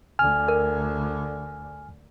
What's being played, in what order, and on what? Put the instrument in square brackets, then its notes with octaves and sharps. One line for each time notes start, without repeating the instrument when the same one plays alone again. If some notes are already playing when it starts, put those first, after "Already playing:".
[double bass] D2 D3 [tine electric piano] G#5 F6
[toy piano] A#4